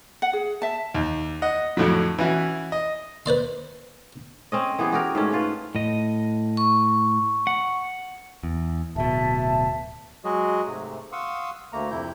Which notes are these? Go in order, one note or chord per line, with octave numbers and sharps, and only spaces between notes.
F#5
G#4
E5 A5
D#2
D#5 F#5
F2 A2 D3 F#3
E3 C#4 E4 F#4
D#5
B4 C5 D5 C6
C4 C#4 D#5
E3 B3 G4 G#4
F#4 G4 A#4
G#2 A3 C#4
C#4 F4 B4
A2 D#5
C#6
F#5
E2
D1 B2 E5 A5
F#3 G#3 F#4 G#4 D#5
G#2 C3 A3
F5 F#5 C6 C#6 D#6 E6
D2 A3 A#3 A#5
F2 C3 E4 G6